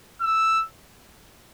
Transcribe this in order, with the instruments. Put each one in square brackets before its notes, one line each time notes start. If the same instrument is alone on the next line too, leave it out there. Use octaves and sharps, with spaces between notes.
[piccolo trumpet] E6